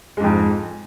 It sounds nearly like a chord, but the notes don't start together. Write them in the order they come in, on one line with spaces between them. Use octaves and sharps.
G#3 G#2 F2